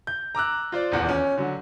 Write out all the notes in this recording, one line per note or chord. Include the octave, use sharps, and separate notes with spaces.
G6
A#5 D6 E6 F#6
F4 C5 D5
D#1 E2 F#5
C#4
D3 F#3